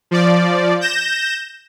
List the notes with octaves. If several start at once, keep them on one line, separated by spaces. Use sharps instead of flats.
F3 D5
G6 A#6 E7